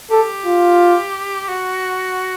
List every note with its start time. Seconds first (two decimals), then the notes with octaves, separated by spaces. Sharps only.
0.11 G4 A4
0.45 F4
1.49 F#4